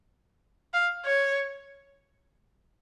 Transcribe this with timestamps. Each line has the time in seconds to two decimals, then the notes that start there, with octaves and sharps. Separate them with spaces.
0.74 F5
1.06 C#5